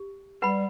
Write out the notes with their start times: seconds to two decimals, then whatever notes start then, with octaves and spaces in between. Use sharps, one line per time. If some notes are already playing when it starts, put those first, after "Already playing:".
Already playing: G4
0.42 G3 B4 F#5 B5